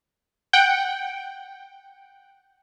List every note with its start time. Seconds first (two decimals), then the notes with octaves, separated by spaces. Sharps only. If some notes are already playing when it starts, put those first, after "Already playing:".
0.53 F#5 G5